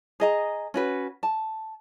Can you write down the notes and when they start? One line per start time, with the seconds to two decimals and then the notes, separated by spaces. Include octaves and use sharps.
0.20 G#4 D#5 A#5
0.74 C#4 F#4 B4
1.23 A5